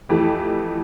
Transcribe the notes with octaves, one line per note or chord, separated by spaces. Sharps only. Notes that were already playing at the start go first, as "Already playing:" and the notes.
F2 E3 A3 G4